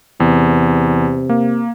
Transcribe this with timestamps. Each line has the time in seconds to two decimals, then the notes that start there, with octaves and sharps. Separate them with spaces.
0.20 E2 C3
1.29 A#3